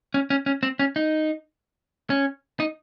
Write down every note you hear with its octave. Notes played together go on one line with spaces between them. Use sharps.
C#4
C#4
C#4
C4
C#4
D#4
C#4
D#4